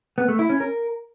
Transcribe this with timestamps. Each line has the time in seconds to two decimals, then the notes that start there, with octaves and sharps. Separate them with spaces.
0.18 B3
0.28 A3
0.39 E4
0.49 C#4
0.60 A#4